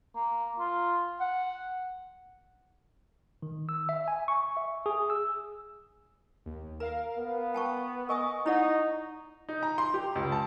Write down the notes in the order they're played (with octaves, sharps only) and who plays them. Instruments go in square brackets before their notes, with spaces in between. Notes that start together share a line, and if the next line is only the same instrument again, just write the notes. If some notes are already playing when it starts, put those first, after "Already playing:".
[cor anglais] A#3
F4
F#5
[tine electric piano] D#3
E6
E5
G#5
C#6
E5
G#4
E6
[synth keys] D#2
[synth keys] A#4 F5 [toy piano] A#5
[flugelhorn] B3
[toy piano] G5 A5 C#6
[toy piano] A#4 G#5 D#6 [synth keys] D#5 C#6
[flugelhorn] D#4 [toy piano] E4 D5 F#5
[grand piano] D#4
A#5
C6
G4
C#2
A5